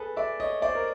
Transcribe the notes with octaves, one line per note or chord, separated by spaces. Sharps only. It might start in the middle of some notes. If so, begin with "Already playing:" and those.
Already playing: G#4 A4 B4
D5 E5
C#5 D#5
C5 D5
A#4